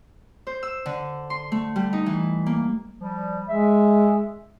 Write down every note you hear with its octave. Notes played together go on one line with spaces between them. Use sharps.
C5
E6
D3
C6
A3
G3
D#4
E3
A#3
F3 G3
G#3 E5